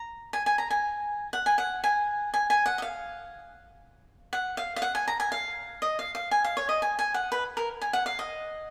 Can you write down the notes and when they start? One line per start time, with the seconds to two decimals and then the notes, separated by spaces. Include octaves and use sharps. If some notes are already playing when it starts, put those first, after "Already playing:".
Already playing: A#5
0.33 G#5
0.46 G#5
0.58 A#5
0.70 G#5
1.33 F#5
1.46 G#5
1.58 F#5
1.84 G#5
2.34 G#5
2.50 G#5
2.66 F#5
2.78 D#5
2.82 F5
4.33 F#5
4.57 F5
4.76 F5
4.82 F#5
4.95 G#5
5.08 A#5
5.20 G#5
5.32 F5
5.82 D#5
5.99 F5
6.15 F5
6.31 G#5
6.44 F5
6.57 C#5
6.69 D#5
6.82 G#5
6.99 G#5
7.14 F#5
7.32 B4
7.57 A#4
7.81 G#5
7.93 F#5
8.06 F5
8.19 D#5